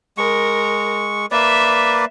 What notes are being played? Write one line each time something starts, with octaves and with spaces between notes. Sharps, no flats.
G#3 A#4 C#6
A#3 B4 D5 E5